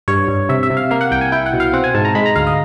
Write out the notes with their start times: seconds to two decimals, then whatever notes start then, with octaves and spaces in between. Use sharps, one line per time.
0.08 G2 C#5
0.28 G2
0.49 C3 E5
0.63 E5
0.70 C3
0.77 F5
0.91 A#3 F5
1.01 F#5
1.11 C2 G5
1.21 G#5
1.32 E4 G5
1.46 F#5
1.53 B2
1.60 F5
1.73 C4 F#5
1.84 G#5
1.95 G#2 A5
2.05 A#5
2.15 G#3 B5
2.26 A#5
2.36 D2 F5
2.47 D#5